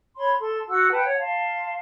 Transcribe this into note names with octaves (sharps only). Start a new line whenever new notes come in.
C#5 B5 C6
A4 C6
F#4 F#5 E6
B4 F#5 G5 A5
C#5 F#5
F5 A5 C6